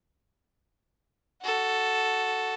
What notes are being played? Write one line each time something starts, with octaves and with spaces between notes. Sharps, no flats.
F#4 A4